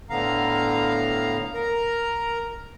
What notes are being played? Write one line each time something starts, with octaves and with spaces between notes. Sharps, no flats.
A2 D3 B3 F5 A#5
A#4 A#5